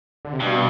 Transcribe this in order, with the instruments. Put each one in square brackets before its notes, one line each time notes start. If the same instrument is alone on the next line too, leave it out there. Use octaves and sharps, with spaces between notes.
[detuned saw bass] D3
C3
[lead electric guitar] G2 [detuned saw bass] B2